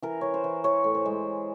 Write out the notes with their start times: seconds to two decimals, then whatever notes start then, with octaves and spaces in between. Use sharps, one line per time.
0.02 E3 A#4
0.21 E3 C#5
0.34 C5
0.44 E3
0.64 E3 C#5
0.84 A2
0.95 C5
1.06 G#3